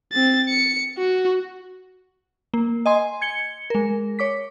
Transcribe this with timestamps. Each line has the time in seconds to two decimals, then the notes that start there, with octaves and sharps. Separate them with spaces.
0.13 C4 A6
0.49 C#7
0.98 F#4
2.54 A#3
2.86 D#5 G#5 C6
3.21 G#6 C#7 G7
3.70 G#3 A#4
4.19 C#5 D6 B6